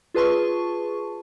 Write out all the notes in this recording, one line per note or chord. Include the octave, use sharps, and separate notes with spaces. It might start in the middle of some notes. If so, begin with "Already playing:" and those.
F4 G#4 B4 A5 C6 C#6